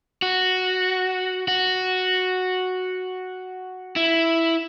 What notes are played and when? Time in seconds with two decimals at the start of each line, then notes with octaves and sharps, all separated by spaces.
0.22 F#4
1.48 F#4
3.96 E4